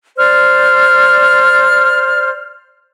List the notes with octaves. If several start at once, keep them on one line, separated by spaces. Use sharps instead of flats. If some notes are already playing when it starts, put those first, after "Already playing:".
C5 D5 F6